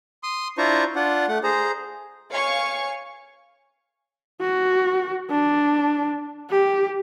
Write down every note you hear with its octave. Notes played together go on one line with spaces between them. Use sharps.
C6 D#6
D4 E4 F4 C5 A#5 C#6
D4 F4 F#5
A3 F#5
G#4 C5 A#5
C#5 F5 G#5 C#6 C#7
F#4
D4
G4